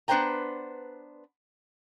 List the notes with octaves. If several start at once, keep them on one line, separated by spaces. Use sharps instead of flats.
B3 D4 B4 C5 G5 A#5